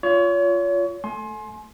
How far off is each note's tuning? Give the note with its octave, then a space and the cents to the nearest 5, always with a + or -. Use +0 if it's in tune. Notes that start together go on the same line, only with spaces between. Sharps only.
F4 +0 C#5 +35
A3 +0 G#5 +35 C6 +25